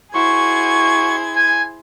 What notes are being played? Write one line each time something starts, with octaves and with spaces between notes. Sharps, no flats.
E4 F#4 G#4 C5 C#6 G#6
G#5